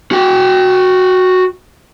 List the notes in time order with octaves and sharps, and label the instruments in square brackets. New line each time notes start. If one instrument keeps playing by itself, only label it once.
[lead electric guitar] F#4 G5